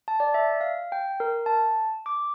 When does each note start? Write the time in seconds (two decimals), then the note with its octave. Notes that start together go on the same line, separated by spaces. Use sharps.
0.08 A5
0.20 D5
0.34 E5
0.61 F5
0.92 G5
1.20 A#4
1.46 A5
2.06 D6